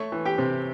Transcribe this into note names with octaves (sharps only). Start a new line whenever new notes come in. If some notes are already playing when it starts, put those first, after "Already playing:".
Already playing: A3 C#5 C#6
E3
G4 G5
C3